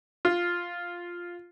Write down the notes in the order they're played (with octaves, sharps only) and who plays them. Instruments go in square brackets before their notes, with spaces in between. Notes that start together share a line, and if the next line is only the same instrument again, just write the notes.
[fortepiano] F4